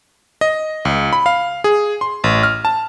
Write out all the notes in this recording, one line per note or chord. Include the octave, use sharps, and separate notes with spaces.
D#5
C#2
B5
F5
G#4
C6
A1
F6
A5